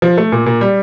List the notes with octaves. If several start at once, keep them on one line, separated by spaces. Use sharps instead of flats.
F3
A3
A#2
A#2
G3